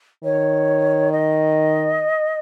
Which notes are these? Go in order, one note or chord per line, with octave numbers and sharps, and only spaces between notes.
D#3 C#5
D#5